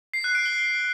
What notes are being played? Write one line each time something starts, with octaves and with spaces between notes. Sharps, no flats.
C7
F#6
D7
G7